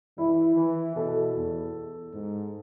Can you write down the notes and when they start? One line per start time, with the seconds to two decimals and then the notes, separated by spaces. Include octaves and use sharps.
0.18 E3 E4
0.56 E3
0.96 B2 A4
1.35 E2
2.13 G#2